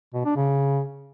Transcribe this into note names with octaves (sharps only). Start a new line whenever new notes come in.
B2
D4
C#3